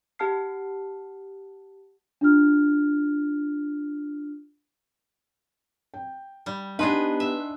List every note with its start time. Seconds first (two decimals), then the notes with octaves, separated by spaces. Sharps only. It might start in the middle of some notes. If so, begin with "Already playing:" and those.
0.19 G4 F#5 A5 F6 C7
2.21 D4 F4 F6
5.94 G5
6.46 G3
6.79 B3 D4 D#4 G4 G#4 B4 F#5 C6
7.20 E5